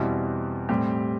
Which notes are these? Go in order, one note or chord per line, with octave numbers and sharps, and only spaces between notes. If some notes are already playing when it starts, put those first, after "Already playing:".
Already playing: E2 B2 G3 C4 E4
A2 G3 C4 G4